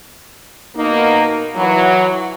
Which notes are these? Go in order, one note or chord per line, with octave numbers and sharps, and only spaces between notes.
B2 A#3 D#4
E3 F#3